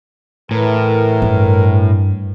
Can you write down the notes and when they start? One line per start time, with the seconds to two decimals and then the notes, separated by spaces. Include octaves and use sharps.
0.51 A2 E3 A#4
1.22 G2